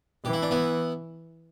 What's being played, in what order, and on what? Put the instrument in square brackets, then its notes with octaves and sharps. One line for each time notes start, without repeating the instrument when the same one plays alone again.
[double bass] E3 [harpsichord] G4
[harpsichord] E4
D4
B3 E4